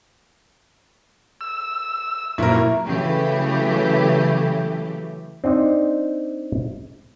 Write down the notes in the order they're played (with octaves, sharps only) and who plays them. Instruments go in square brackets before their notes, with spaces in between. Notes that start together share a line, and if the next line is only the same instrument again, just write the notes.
[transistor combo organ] E6
[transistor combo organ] F#2 A#2 [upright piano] E4 A#4
[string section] C#3 E3 F#3 A3 G4
[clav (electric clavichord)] C4 D4 D#4